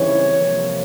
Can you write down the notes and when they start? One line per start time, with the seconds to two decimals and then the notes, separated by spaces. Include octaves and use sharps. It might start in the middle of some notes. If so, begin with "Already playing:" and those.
Already playing: C#3 E3 G3 C4 D#4 C#5
0.36 C3 F3 A#3